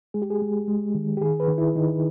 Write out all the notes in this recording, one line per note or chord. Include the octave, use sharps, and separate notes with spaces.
G#3 G#4
G4
G#4
G#3
G#3
D#3
G4
D#3 G#4
B4
D#3
E4
D#3 D#4